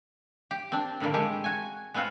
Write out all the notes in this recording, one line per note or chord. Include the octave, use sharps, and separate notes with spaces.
G4
C4 D4
A2 D3 D#3 G3 A#3
G#3 A3 G4
F#4 G#5
G#3 B3 C4 F4 F#4